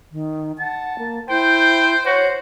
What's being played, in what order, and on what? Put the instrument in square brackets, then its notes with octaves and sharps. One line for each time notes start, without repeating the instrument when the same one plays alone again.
[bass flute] D#3
[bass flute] F#5 [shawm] A5
[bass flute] A#3
[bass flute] E4 [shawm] C5 [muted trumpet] G5
[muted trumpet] F#4 [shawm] C5 [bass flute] C#5